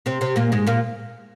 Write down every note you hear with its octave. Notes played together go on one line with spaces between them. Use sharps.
C3 C4
C3 C4
A#2 A#3
G#2 G#3
A#2 A#3